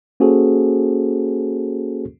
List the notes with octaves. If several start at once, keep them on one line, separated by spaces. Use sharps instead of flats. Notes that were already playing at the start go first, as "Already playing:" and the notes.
A#3 C#4 F#4 G#4 A4 C5